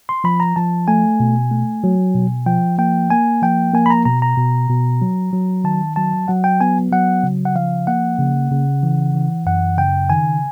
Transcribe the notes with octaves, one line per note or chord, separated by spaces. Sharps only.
C6
F3 B5
A#5
F3 A5
A3 G#5
B2
A3
F#3
B2
F3 G5
A#3 G5
A#3 G#5
F3 G5
A#3 G#5
B5
A#5
B2 A#5
A#5
B2
B2
F#3
F#3
D#3 A5
F#3 A5
F#3 F#5
G5
B3 G#5
F#3 F#5
C#3
F#5
F3 F5
A#3 F#5
C#3
C#3
E3
E3
F#2 F#5
C#3 G5
D#3 G#5